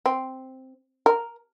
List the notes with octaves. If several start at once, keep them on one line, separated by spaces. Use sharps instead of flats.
C4
A#4